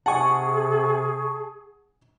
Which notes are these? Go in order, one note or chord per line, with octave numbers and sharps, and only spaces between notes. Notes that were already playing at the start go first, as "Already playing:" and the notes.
C3 G#4 F#5 G#5 A5 C#6